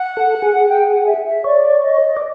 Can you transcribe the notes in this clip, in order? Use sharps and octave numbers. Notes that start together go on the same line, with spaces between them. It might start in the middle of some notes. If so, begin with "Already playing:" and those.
Already playing: F#5
A4
G#4
G5
F#5
E5
E5
C#5 D5
D#5
D5